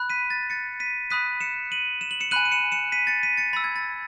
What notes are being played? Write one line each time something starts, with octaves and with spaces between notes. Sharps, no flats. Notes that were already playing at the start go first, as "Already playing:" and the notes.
Already playing: B5 F#6
B6 D#7
A6
A6 C#7
B6 D#7
B5 D#6 F#6 B6 D#7
C#7 E7
D#7 F#7
E7
F#7
C#7 E7
G#5 B5 F#6 D#7 F#7
D#7
C#7 E7
C#7 E7
B6 D#7
A6 C#7
B6 D#7
A6 C#7
B5 E6 A6
G#6
A6